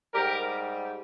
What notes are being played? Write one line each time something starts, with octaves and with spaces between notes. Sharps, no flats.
G#2 G3 G4 A#4